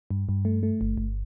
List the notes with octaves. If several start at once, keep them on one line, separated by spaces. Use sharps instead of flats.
G2
G2
A3
A3
G1
G1